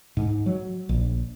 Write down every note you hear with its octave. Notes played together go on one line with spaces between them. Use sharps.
G#2
F#3
A#1